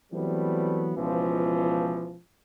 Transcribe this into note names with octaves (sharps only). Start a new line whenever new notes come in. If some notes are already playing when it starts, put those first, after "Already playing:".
E3 F#3 G3 A3 B3 C4
C#2 B2 E3 F3